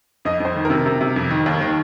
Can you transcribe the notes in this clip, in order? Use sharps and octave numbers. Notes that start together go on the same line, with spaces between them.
F2 D#5
F2 C5
D#3
A#4
C3
C3
C3
F2
D#3
D#2
D#3